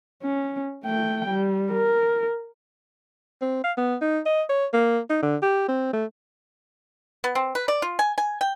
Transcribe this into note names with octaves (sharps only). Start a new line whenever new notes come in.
C#4
A3 G5
G3
A#4
C4
F5
B3
D#4
D#5
C#5
A#3
D#4
D3
G4
C4
A3
B3
C4
B4
D5
F4
G#5
G#5
G5